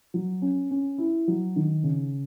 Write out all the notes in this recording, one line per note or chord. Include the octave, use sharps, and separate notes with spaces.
F#3
C#4
C#4
E4
F#3
D#3
C#3